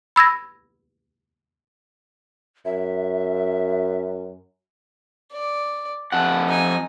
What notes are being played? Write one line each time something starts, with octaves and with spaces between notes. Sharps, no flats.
B5 E6 G#6 A#6
F#2 E5
D5
F2 F#5 A5
D#4 G#5